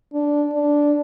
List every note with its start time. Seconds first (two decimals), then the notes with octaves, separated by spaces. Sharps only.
0.13 D4
0.53 D4